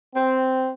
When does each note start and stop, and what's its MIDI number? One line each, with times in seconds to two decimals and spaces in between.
0.15 0.70 60